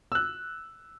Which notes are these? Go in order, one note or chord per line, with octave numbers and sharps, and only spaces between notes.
E6 F#6